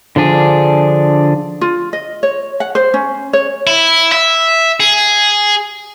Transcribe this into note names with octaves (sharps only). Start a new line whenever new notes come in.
D3 F3 D4 G#4
F4
D#5
C#5
F#5
C5
C#4
C#5
E4
E5
G#4